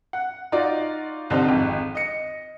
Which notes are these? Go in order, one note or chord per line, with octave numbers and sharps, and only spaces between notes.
F#5
D#4 F4 F#4 D5
C2 D3 D#4 C5
G#1 F2 F3
D#5 C#7